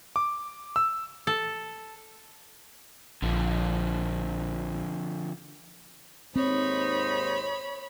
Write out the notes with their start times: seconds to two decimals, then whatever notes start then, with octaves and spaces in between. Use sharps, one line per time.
0.16 D6
0.76 E6
1.27 A4
3.22 A#1 D3 F3
6.36 D#2 G#2 C4 D#4 C5 C#5 B5